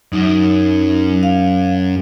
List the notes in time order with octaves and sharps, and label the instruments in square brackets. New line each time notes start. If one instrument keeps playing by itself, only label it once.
[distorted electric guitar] F#2 [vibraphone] D#4
[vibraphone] F5